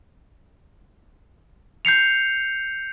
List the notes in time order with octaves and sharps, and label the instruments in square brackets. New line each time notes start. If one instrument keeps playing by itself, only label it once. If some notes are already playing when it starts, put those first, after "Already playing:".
[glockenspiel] G6 C7 C#7 F7